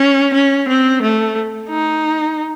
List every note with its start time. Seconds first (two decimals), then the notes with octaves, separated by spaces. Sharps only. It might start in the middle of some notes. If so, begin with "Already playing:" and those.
Already playing: C#4
0.34 C#4
0.69 C4
1.02 A3
1.69 D#4